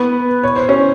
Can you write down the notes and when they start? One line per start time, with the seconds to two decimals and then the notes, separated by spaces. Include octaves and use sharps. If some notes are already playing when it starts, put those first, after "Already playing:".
Already playing: B3 B4
0.43 C#5
0.56 C5
0.69 C#4 C#5